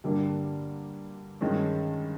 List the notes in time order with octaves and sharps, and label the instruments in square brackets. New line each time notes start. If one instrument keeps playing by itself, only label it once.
[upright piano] G2 D3 G3 A#3 D4
G2 D#3 G#3 C#4